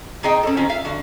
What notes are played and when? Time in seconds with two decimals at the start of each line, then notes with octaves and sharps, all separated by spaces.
0.23 C3 D#4 G#4 D#5 G5
0.43 C#4 A4
0.57 D#3 C4 C#4 F4
0.69 E5 F5
0.85 D3 F#4